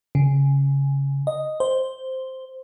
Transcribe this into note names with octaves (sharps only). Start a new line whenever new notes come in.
C#3
D#5
C5